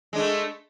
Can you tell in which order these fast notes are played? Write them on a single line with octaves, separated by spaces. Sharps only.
G#3 D4 A3